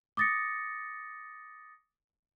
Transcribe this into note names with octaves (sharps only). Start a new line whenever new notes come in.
D6 D#6 A6 A#6 C#7